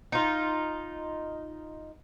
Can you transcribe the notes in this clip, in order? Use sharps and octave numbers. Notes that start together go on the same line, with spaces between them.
D#4 F4